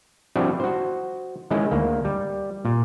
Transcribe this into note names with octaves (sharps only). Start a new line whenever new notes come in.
F3 G3 C4 D4 E4 F#4
F#4 C5
D#3 G#3 C#4 E4
D2 A#3
G3
A#2